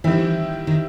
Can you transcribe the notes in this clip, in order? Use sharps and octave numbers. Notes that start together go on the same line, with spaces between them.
D#3 E3 G3 C4 E4
D#3